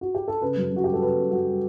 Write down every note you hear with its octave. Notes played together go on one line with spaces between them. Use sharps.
F#4
G4
A4
C#3 B4
F#2
F#2 F#4
G3 G4
A4
C#3 B4
F#2
F#2 F#4
G3